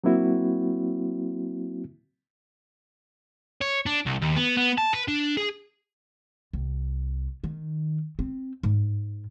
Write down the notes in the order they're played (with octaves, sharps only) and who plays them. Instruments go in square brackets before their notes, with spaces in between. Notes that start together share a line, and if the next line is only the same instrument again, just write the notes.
[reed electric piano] F#3 A#3 C4 E4 F#4
[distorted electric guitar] C#5
D4
C2
D#2
B3
B3
A5
B4
D4
G#4
[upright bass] C2
D#3
C4
G#2